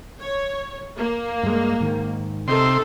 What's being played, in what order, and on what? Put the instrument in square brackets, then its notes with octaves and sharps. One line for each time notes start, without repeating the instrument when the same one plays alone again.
[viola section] C#5
A#3
[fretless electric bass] G2 G#3
G#2 D#3
[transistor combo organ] C3 C6 [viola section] D#4 A4